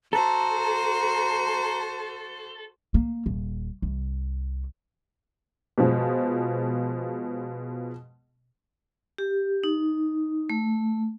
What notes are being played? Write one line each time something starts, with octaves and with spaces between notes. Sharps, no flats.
F#4 A4 C5 A#5
A#3
D#1
C2
B2 F3 G#3
G4
D#4
A3